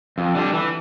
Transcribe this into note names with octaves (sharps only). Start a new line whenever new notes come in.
F2
D3 G3 D4
E3